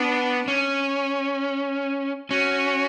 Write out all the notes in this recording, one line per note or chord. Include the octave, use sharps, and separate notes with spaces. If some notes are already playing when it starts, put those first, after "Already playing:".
Already playing: B3 D4
C#4
C#4 F#4